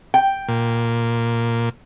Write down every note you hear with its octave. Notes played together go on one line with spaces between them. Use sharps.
G5
A#2